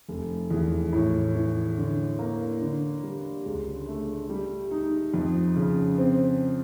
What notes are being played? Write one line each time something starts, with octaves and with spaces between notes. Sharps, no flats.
F1
E2
A2
E3
D3
A#3
D3
G3
C#2
A3
G3
D#4
F2
C#3
C4